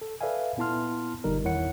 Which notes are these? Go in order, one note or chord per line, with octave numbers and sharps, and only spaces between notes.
A4
A4 B4 D5 E5 F5 G#5
A#2 B3 E4 A5 C6 F6
G1 A#2 D3 G3 D#4 A#4
E2 D#3 E4 C#5 F#5 C#7